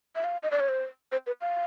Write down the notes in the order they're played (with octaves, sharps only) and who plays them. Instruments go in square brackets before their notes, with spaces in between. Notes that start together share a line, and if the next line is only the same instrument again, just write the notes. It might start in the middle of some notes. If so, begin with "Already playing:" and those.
[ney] E5
F5
D#5
D5
C#5
C5
C5
B4
F5